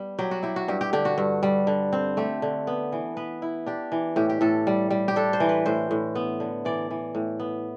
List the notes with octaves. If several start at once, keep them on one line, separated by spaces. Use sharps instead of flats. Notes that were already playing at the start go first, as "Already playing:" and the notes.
Already playing: G3 B3
F#3 G4
F#4
E4 G4
F#4
G2 G4
G4
D3 G4
F#4
G2
G3
D3
C4
A3 G4
D3
B3
E3
B3 B4
E4
D4 G4
E3
A2 G4
G4
A2 A4
G3
G3
G4
D4 A4
C5
E3
B4
A2 C5
A2
B3
D3
E3 D5
E3
A2
B3